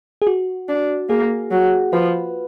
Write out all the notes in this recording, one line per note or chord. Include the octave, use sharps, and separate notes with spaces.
G#4
F#4
D4
A#3 G#4
F#3
F3 B4